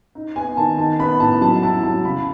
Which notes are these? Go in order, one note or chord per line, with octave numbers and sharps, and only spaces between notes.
D#4
B3 G#5
D#3 A5
D#4 A5
B3 B5
A2 A5
F#3 A5
E4 A5
F#3 A5
C#3 B5